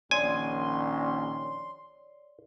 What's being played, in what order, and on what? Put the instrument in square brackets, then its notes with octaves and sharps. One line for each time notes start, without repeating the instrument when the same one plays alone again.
[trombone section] A#1 D#3 C#4 [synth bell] C#5 D5 [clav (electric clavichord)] G#5 [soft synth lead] C6